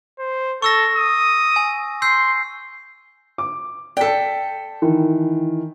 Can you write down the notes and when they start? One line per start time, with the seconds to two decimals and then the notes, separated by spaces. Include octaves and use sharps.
0.19 C5
0.62 A4 C#6 E6 A#6
0.97 D#6
1.56 G#5
2.02 C6 E6 G6 C7
3.38 D6
3.97 A4 D5 G5 B6
4.82 D#3 E3